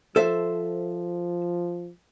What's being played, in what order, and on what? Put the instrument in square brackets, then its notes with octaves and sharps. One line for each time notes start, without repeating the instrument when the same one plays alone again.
[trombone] F3 [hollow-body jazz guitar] A4 C5 E5